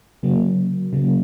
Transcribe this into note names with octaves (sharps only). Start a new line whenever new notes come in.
C#3 F#3 A#3
C#3 F#3 A#3